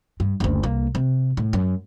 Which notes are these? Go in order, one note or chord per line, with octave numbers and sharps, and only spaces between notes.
G2
F#1 D2
C2 A#3
C3
A2
F#2